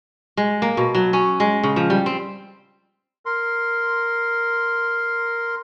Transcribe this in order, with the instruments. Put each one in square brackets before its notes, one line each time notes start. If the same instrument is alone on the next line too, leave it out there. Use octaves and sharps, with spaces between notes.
[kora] G#3
A#3
B2
F#3
C#4
G#3
C#3
F3
G3
C4
[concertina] A#4 C6